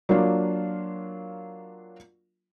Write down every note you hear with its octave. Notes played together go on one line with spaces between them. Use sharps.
F#3 A#3 D4 F4